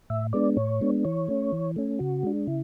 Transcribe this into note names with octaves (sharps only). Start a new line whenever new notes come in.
A2 E5
G#3 B3 D4 D5
A2 C#5
G#3 B3 D4
E3 C#5
A3 C#4
E3
A3 C#4
C#3 F#4
G#3 D4
C#3 E4